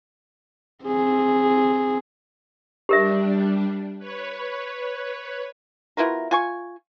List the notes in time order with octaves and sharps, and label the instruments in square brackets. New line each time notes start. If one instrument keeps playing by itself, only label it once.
[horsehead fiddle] C4 G#4
[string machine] G3 D4 [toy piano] G4 A#4 E5
[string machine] B4 C#5
[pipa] B2 E4 F4 A#4
F4 G#5 C#6